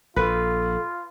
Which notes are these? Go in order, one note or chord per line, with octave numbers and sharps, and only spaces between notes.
A#1 F4 A4 B4